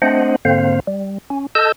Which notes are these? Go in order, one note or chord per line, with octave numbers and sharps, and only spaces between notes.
A3 C4 D4 C5 D#5 F#5
G#2 D3 A#3 C4 C5 F5
G3
C#4
A4 D#5 A5 E6 G6